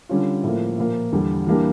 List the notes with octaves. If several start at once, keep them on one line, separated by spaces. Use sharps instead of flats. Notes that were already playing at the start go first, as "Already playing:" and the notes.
D3 G3 C#4 F4
A2 F3 A#3
A#2 F3 A#3
E2 D3 G3
E3 G3 A#3 D4 G4